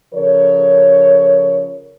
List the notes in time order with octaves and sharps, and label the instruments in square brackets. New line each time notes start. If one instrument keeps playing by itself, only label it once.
[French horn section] C#3 F3 A4 A#4 C#5